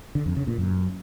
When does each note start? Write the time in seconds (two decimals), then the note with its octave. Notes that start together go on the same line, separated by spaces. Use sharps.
0.15 D3
0.26 F2
0.37 C#3
0.47 A#2
0.58 F#2